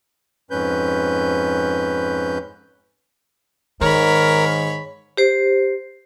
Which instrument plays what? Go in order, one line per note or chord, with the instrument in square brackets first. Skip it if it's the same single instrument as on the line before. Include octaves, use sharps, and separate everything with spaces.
[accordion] F2 G#2 C#4 B4 G6
[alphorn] G#2 [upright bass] D#3 [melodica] A#4 [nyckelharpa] C#5 B5
[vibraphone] G4 C5